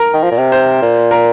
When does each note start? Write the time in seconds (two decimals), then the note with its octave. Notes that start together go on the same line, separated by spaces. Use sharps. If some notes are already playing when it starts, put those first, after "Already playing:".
Already playing: A#4
0.13 D#3
0.23 F3
0.31 A#2
0.38 C3
0.52 C5
0.82 A#2
1.11 A#4